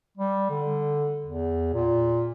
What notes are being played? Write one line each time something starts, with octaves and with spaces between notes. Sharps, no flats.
G3
D3
E2
A#2